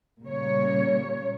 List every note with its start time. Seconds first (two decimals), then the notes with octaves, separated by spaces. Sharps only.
0.23 A#2 C#3 G3 C#5